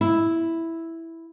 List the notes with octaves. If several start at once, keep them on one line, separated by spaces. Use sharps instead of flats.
E4